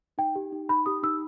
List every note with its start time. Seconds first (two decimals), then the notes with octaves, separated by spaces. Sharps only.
0.18 D#4 G5
0.35 G4
0.52 D#4
0.69 D#4 B5
0.86 G4 D#6
1.03 D#4 E6